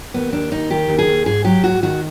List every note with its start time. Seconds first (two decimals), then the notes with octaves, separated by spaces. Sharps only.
0.14 D#2 B3
0.32 D#2 D4
0.52 D#2 D#4
0.70 D#3 G4
0.88 D#2
0.99 G#4
1.07 D#2
1.26 G#2 G#4
1.44 F#3 G4
1.64 G#2 F#4
1.83 D#3 F#4